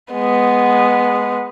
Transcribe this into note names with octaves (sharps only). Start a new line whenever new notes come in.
G#3 B3